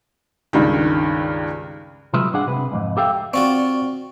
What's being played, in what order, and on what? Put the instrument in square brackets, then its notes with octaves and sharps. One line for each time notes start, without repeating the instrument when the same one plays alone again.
[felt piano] C#2 G2 D#3
[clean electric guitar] C3 F#3 G#3 F4 B4 E5
G2 D4 G#4 F#5
C3 B4
C2 F2 G#2
G4 A4 E5 F5 G5
[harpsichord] C4 F4 F#4 [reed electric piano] D5 C#6